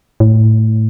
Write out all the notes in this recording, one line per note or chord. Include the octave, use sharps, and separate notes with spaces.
A2